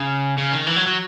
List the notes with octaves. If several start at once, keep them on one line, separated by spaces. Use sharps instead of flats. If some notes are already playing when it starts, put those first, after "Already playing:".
Already playing: C#3
C#3
D#3
E3
F#3
F#3